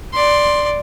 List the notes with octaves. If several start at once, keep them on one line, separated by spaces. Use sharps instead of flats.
D5 C6